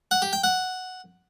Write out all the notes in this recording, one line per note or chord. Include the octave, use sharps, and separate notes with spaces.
F#5
G4
G5
F#5